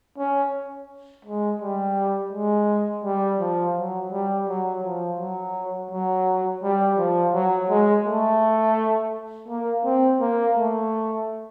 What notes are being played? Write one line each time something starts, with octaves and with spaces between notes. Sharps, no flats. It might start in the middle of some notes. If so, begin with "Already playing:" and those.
C#4
G#3
G3
G#3
G3
F3
F#3
G3
F#3
F3
F#3
F#3
G3
F3
F#3
G#3
A3
A#3
C4
A#3
A3